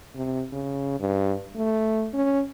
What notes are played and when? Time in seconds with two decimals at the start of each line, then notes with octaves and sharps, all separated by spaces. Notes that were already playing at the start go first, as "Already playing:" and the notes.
0.15 C3
0.52 C#3
0.99 G2
1.56 A3
2.13 C#4